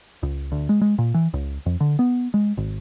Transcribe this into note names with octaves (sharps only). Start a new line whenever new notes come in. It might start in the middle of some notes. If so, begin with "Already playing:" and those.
C#2
D2
G#3
G#3
A#2
E3
C#2
F2
D3
B3
G#3
G#1